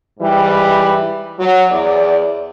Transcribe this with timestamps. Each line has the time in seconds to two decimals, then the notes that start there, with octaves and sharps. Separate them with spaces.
0.20 G#2 E3 G3
1.40 F#3
1.71 E2 D5